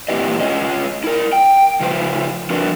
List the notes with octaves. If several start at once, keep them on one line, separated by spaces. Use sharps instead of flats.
E2 A#2 E4 G4 B4 D#5
C#4 F4 G#4 C#5 D#5
E4 A#4
G5
C#3 F3 F4 B4 C5
F3 D4 F#4 A#4 B4